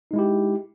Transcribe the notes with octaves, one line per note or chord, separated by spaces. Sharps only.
G#3 D#4 E4 G4